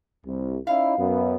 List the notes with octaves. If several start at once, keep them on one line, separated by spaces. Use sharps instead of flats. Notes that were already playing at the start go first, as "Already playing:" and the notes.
C2
C#4 D#4 E4 F5
F#2 B3